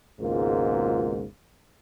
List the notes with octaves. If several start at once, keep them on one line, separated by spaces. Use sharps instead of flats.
G#1 C#2 G#2 B2 A#3 F4